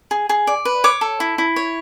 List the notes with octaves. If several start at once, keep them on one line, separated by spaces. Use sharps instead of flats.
G#4
G#4
D5
B4
C#5 D6
A4
E4
E4
C#5